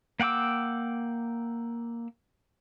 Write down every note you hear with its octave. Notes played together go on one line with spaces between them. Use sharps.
A#3 F#5 G5 D6 E6